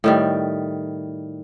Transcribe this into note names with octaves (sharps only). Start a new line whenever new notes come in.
A2 D#3 G3